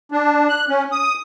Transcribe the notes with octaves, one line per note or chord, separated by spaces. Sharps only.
D4
F#6
C#4
D#6